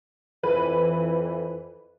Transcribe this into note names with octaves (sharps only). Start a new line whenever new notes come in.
F2 E3 B4